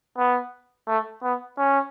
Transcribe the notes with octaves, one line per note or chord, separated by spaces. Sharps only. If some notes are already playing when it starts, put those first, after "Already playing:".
B3
A3
B3
C#4